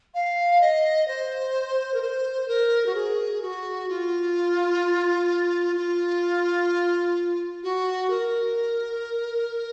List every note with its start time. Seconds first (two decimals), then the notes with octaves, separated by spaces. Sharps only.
0.14 F5
0.60 D#5
1.08 C5
1.93 A#4
2.01 C5
2.48 A#4
2.86 F#4
2.94 G#4
3.42 F#4
3.89 F4
5.76 F4
7.63 F#4
8.10 A#4